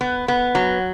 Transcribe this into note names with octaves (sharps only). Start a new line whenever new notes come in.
B3
B3
F#3